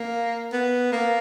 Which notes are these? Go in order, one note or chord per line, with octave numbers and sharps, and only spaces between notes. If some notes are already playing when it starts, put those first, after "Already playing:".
Already playing: A#3
B3
A#3